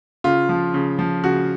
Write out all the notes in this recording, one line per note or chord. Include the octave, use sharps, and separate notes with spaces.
C#3 F4
F3
C#3
F3
C#3 F#4